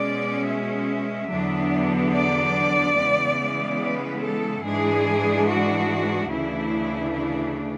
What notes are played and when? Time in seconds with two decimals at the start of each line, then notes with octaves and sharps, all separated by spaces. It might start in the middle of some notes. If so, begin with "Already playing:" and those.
Already playing: B2 G#3 C#4 D5
0.48 E5
1.31 E2 D3 F#3 B3 D4
2.15 D5
2.98 C#3 E3 G#3 B3
3.81 B4
4.23 A4
4.64 G#2 E3 G#3 D4 G#4
5.47 F#4
6.30 D2 C#3 E3 A3 D4 E4
7.14 E4